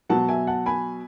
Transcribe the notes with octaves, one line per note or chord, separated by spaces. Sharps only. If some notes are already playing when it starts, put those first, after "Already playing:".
B2 F#3 F#5 A5
E5 G#5
F#5 A5
G#5 B5